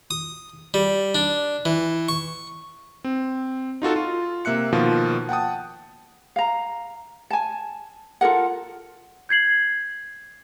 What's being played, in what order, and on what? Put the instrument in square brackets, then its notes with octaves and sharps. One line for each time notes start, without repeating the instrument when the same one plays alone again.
[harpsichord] D#6
G3
D4
E3
C#6
[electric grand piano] C4
D#4 F4 F#4 A4
F4
C3 A#3 E5 F#6 C#7
B2 D#3 F3 A#3 F4
F#5 G5 A5 D#6
[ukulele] F5 A#5
G#5 A5
F4 A4 A#4 F#5
[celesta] G6 G#6 C7 F#7